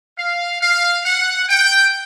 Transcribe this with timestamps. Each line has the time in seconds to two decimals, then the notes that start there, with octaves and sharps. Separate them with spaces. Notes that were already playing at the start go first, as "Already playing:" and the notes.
0.17 F5
0.60 F5
1.04 F#5
1.48 G5